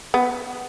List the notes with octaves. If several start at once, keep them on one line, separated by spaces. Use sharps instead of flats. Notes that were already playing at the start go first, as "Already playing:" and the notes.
B3